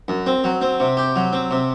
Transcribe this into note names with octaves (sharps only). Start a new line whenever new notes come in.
F#2
C4
F#3
C4
C3
G4
F#3
C4
C3